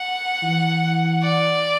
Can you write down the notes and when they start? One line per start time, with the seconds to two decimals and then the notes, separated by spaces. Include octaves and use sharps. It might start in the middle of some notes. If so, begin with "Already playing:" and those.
Already playing: F#5
0.43 E3
1.23 D5